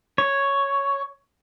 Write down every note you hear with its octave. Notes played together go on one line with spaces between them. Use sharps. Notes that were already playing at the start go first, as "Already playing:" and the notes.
C#5